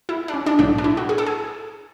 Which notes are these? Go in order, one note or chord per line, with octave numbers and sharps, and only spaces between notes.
E4
D4
C#4
D4
B1 A2 F#3 D4
D4
E4
F#4
G#4
A4
G#4